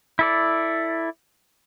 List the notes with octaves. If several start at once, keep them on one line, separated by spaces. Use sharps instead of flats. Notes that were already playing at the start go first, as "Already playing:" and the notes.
E4 A4 D5